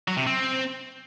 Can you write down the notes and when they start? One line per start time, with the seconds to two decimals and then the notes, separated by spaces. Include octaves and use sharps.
0.08 F#3
0.17 C3
0.27 C4